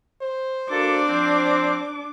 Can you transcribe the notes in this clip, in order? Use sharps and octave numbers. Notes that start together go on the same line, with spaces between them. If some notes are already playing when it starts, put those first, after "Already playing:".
C5
A#3 D4 F#4 A4 D6
F3 C4